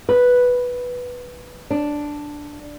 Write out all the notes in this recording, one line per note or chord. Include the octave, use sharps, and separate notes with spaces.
B4
D4